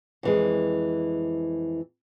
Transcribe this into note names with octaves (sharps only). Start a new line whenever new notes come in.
F2 E3 G#3